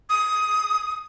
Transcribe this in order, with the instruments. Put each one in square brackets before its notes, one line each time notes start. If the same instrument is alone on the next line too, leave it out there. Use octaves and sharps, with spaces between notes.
[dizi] D#6